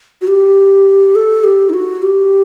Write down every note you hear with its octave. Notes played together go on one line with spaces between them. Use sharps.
F#4
G4
A4
G4
D#4
F#4
G4